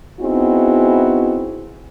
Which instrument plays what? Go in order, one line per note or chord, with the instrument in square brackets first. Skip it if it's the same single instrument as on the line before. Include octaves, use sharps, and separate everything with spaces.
[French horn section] B3 C4 D#4 E4 F#4 G#4